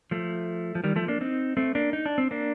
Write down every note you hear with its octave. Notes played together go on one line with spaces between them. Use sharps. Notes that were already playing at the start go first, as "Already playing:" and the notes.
F3 A3
F3
D#3 G3
F3 A3
A#3 D4
C4 D#4
A3 C4
A#3 D4
D#4
D4
C4
A#3 D4